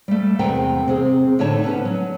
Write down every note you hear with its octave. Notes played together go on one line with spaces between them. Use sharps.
G3 A3
E2 C3 B3 A#4 G5
C3 C4 G#4
A2 D3 D#4 C#5 A5
B3 C#4 B4
F#3